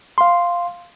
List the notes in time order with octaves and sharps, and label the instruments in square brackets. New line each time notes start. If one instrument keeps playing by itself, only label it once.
[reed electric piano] F5 C6